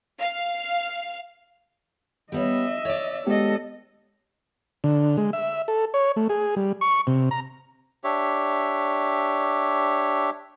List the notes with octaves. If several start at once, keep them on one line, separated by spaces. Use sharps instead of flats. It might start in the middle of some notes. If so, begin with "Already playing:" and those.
F5
G3 B3 C#4 D#5 E5
C#5 D5
G#3 B3 G4 A4 D#5
D3
G#3
E5
A4
C#5
A3
G#4
G3
C#6
C3
A#5
D4 G4 C#5 E5